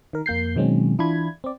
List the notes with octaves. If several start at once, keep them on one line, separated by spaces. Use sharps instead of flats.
D#3 A#4
F2 A#3 G6 C7
B2 D#3 F#3 G#3 C4 C#4
E3 D4 E4 F4 B5 G#6
C4 D5